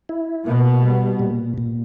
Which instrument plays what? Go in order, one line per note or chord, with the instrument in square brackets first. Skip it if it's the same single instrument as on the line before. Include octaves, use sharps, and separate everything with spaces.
[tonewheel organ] E4
[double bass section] B2 [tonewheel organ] A#3
[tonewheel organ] G3
A#2
A#2